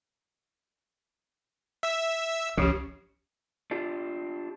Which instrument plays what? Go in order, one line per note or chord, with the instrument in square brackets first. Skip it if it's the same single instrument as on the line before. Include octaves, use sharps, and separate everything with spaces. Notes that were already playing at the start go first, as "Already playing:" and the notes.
[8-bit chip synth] E5 E6
[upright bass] G1 C#2 [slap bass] C#3 [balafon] F3 C#4 G4
[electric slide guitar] D4 F4 G4